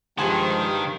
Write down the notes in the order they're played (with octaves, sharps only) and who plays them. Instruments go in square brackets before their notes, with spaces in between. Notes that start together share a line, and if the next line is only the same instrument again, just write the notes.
[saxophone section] G2 [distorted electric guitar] D#3 [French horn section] F3 G#3 G4 [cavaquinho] C5 G#5 A5